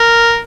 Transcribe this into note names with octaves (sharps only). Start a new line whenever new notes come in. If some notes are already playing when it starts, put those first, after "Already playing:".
Already playing: A#4